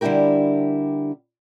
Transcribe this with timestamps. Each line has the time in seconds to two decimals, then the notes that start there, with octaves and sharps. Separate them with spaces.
0.01 D3 G3 D4 E4 G4 A#4